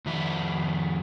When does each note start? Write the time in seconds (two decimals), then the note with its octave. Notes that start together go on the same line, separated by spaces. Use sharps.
0.06 F2 D#3 E5